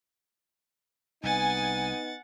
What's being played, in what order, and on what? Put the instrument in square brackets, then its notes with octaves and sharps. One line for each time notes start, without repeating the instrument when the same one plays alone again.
[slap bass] C2 [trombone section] B3 D#4 [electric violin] F#5 A6 [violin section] G#5